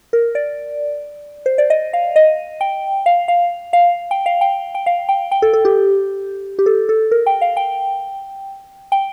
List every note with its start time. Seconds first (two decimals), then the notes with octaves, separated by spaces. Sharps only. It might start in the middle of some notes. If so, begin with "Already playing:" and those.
0.13 A#4
0.35 D5
1.46 C5
1.58 D5
1.70 D#5
1.93 F5
2.16 D#5
2.61 G5
3.06 F5
3.28 F5
3.73 F5
4.11 G5
4.26 F5
4.41 G5
4.75 G5
4.86 F5
5.09 G5
5.32 G5
5.42 A4
5.53 A4
5.65 G4
6.59 G4
6.66 A4
6.89 A4
7.11 A#4
7.26 G5
7.41 F5
7.57 G5
8.92 G5